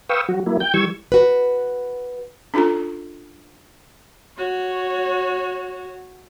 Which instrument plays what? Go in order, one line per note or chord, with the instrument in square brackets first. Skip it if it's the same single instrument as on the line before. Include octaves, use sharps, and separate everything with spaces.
[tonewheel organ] B4 F5 G5 C#6 D#6 E6
F#3 F#4
F#3 A#3 E4
G5 G6
E3 G3 C#6 E6 G#6
[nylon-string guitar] F#4 B4
[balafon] C#4 D4 F4 A4 A#5
[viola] F#4 C#5